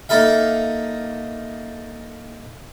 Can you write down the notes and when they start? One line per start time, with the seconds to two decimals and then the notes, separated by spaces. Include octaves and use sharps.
0.09 A#3 D#4 A4 E5 F5